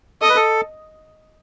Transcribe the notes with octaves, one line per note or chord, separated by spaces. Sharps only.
A4 D#5
B4
A4